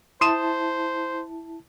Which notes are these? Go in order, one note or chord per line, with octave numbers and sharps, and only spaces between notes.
E4 C5 A5 C6 D#6 E7